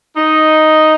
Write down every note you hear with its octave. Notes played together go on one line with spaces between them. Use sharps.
D#4